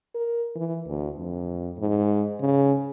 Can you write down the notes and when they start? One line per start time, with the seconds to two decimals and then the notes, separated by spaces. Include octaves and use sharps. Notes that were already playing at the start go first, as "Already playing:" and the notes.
0.15 A#4
0.56 E3
0.87 D2
1.18 F2
1.79 G#2
2.41 C#3